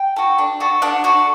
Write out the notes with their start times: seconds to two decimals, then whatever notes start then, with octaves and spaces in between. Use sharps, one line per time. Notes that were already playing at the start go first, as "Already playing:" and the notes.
Already playing: G5
0.16 F#4 A4
0.38 D4
0.60 F#4 A4
0.82 D4 F#5
1.04 F#4 A4